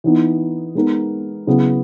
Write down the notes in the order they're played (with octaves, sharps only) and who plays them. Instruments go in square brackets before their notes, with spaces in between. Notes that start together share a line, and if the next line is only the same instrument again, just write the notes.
[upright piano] E3 B3 D#4
G#3 B3 D#4 A#4
C#3 F#3 B3 E4